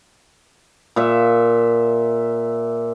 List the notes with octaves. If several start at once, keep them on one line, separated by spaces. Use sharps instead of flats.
A#2 E5